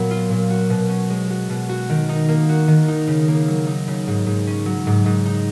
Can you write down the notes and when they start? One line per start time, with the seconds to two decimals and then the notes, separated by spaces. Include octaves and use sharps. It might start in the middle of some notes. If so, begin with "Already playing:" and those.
Already playing: A#2 F#3 B3
0.11 F4
0.30 A#2
0.50 F#4
0.70 B2
0.89 C#4
1.10 G#3
1.30 F#4
1.50 B2
1.69 F#4
1.89 D#3
2.09 D#4
2.28 A#3
2.49 F#4
2.68 D#3
2.88 D#4
3.08 C#3
3.28 A#3
3.48 F#3
3.67 D#4
3.88 C#3
4.08 G#2
4.27 G#2
4.47 C#4
4.66 F#3
4.87 G#2
5.06 G#2
5.25 D#4